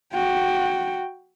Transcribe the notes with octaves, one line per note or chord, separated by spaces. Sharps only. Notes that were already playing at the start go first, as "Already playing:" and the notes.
F#4 G5